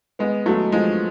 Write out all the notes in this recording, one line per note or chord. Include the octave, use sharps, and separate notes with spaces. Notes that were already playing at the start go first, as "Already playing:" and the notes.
G#3 B3
F#3 A3
F3 G#3